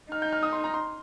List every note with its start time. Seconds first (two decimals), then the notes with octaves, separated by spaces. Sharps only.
0.12 D#4 F6
0.22 G6
0.33 F6
0.43 D#6
0.53 C6
0.64 A#5
0.74 C6